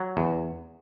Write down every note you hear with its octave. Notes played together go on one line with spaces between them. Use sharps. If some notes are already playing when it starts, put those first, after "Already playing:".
Already playing: F#3
E2